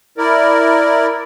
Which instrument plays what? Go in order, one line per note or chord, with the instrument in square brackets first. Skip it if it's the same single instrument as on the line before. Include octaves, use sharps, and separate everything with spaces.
[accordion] E4 A#4 D5